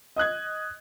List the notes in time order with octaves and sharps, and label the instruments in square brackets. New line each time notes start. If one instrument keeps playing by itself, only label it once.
[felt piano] D#5 D#6 F#6 G#6